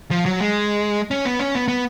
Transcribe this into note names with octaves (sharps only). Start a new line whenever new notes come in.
F3
F#3
G#3
C#4
B3
C#4
B3
B3